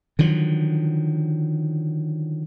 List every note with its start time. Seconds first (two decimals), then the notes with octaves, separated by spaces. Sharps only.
0.19 D3 D#3 F3 F#3